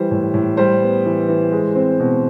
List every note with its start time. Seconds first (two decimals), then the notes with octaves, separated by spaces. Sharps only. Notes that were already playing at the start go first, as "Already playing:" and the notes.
Already playing: E3 G3 C5
0.11 A2
0.34 A2
0.57 G3 C5
0.82 B3
1.05 E3
1.28 E3
1.52 G#3
1.75 C4
2.00 B2